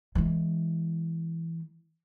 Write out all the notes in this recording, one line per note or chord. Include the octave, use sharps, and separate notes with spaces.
E3 G#3